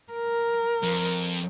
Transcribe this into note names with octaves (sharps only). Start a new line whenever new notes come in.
A#4
F2